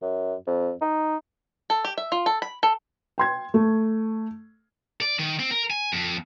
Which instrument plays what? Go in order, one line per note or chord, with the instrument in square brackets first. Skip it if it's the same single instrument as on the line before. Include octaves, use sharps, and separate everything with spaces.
[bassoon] F#2
F2
D#4
[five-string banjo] A4
G4
E5
F4
A4
B5
A4
[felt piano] G5 C6 G#6
A3
[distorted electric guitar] D5
D#3
C4
A#4
G#5
F2